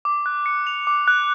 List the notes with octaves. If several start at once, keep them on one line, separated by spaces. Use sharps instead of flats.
D6
F#6
C#7
F7
D6
F#6